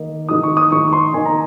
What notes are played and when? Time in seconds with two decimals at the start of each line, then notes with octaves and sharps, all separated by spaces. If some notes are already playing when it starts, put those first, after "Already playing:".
Already playing: D#3 A#3 D#4
0.29 D#3 A#3 D#4 D#6
0.43 C#6
0.57 D#6
0.71 D#3 A#3 D#4 C#6
0.88 C#6
0.93 C6
1.14 D#3 A#3 D#4 G#5
1.26 A#5